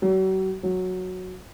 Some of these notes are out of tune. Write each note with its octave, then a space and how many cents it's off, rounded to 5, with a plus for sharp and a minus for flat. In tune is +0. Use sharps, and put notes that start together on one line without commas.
F#3 +40
F#3 -5